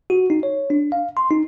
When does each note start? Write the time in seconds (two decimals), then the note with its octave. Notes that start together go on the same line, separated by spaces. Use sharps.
0.10 F#4
0.30 D#4
0.43 C#5
0.70 D4
0.92 F5
1.17 C6
1.31 D#4